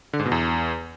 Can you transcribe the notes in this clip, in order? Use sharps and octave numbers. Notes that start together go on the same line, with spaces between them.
D3
G#2
B2
E2